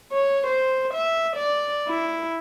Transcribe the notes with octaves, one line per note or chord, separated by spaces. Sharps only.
C#5
C5
E5
D5
E4